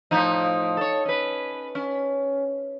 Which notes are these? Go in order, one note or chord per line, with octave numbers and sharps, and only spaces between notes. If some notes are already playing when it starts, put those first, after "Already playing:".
A2 F3 D#4
A4 C#5
C#4 B4
C#4